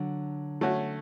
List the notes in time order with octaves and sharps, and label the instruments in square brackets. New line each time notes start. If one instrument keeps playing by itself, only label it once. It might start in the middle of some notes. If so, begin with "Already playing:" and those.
Already playing: [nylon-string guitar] D3 F#3
[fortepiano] A3 C#4 F#4